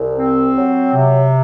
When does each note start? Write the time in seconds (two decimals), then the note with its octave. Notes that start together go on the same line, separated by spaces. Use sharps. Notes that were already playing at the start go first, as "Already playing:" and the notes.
Already playing: C2
0.18 C4
0.56 F#3
0.93 C3